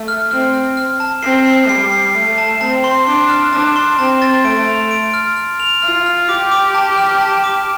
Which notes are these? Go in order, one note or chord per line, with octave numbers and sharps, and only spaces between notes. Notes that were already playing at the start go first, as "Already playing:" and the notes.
Already playing: A3
F6
C4 F6
F6
F6
A5
C4 C7
C7
G3 C7
C7
A3 C7
A5
C4 A5
C6
D4 C6
F6
D4 A5
C6
C4 A5
A6
A3 D7
F7
D7
F6
F6
F7
F4 F6
F6
G4 D6
D6
A5
F6
A5
D6